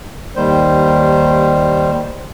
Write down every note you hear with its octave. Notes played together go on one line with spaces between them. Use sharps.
D#2 D#3 G3 C5